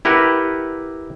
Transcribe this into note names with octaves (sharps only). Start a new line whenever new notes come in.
E4 G4 A#4 B4 F#5